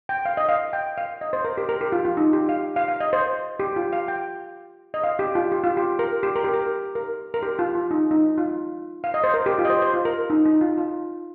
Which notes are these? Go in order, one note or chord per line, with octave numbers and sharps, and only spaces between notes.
G5
F5
D#5
F5
G5
F5
D#5
C5
A#4
G4
A#4
G4
F4
F4
D#4
G4
F5
F5
F5
D#5
C5
G4
F4
F5
G5
D#5
F5
G4
F4
G4
F4
G4
A#4
G4
A#4
G4
A#4
A#4
A#4
G4
F4
F4
D#4
D#4
F4
F5
D#5
C5
A#4
G4
F4
D#5
C5
C5
F4
A#4
D#4
D#4
F4
F4